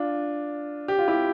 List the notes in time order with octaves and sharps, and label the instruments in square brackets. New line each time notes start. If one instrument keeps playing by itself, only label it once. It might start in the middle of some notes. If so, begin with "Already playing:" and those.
Already playing: [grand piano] D4 F4
G4
F4
E4 G4